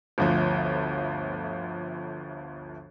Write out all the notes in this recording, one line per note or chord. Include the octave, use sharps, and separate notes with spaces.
G1 D2 F3